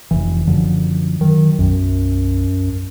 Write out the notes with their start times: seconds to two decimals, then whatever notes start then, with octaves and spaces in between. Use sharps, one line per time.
0.11 F1 E3
0.47 F#2 D3 F3
1.21 D#3 F#3
1.59 B1 F#2